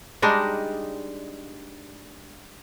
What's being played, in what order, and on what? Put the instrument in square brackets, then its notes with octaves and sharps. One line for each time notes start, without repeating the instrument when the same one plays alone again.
[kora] G3 G#3 D4 D#4